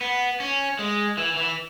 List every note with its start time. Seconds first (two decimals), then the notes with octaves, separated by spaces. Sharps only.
0.01 B3
0.40 C#4
0.79 G#3
1.17 E3
1.37 E3